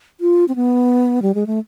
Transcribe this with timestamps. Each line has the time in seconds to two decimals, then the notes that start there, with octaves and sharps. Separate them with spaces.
0.20 F4
0.48 C4
0.56 B3
1.22 G3
1.35 G#3
1.47 A3